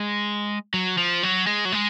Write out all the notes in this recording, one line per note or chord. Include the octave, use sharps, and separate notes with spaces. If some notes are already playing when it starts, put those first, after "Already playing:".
Already playing: G#3
F#3
F3
F#3
G#3
F#3
G#3